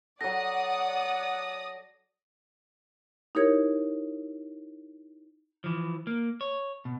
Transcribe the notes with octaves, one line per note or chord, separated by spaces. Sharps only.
F#3 A4 D5 F#5 D#6 A#6
D#4 E4 G4 A#4 C#5 G#6
E3 F3
A#3
C#5
B2